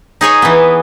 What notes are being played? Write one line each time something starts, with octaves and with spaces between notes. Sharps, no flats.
D#4 G#4 C#5 G#5
E3 B3